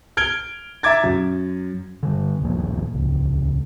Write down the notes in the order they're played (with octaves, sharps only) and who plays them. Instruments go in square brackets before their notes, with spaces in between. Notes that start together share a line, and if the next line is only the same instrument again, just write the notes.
[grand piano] F6 G#6 D7 G7
E5 A#5 D6 G#6 A6
F#2
[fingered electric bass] D3 G3
D1 A#1 F3 A#3
D#1 C#2